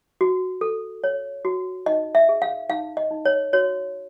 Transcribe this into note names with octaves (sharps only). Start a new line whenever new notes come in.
F#4
A4
C#5
F#4
D#4 D#5
E5
G#4
F5
D#4 F5
D#5
D#4
C#5
F#4 C#5